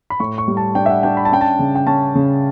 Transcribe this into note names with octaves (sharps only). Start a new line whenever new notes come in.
B5
A2 C#6
C#6
G3
A5
D4 G5
E5
F#5
D4 G5
B5
A5
C#4 G5
A5
C#3
G5
C#4 A5
C#3